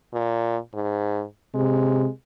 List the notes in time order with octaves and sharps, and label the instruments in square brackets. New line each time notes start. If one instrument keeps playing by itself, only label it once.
[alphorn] A#2
G#2
[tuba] C3 [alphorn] G#3